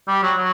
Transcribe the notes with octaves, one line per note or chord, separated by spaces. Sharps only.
G3
F#3
F#3